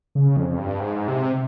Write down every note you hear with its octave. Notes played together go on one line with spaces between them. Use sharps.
C#3
F2
G2
G#2
C3